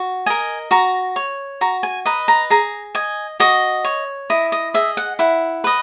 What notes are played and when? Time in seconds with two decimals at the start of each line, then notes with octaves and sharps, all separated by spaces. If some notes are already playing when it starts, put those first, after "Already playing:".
Already playing: F#4
0.26 A#4 D#5 G#5
0.71 F#4 A#5
1.16 C#5
1.61 F#4 A#5
1.83 G#5
2.05 B4 D#5 A#5
2.28 A#5
2.50 G#4 A#5
2.95 D#5 G#5
3.40 F#4 D#5
3.84 C#5
4.30 E4 D#5
4.52 D#5
4.74 G#4 D#5 E5
4.97 F#5
5.19 E4 F#5
5.64 B4 D#5